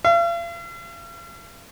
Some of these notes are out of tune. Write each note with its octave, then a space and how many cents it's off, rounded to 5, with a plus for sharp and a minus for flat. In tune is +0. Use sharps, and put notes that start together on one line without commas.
F5 -45